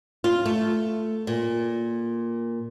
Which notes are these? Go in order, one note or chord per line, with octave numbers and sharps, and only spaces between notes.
F4
A3
A#2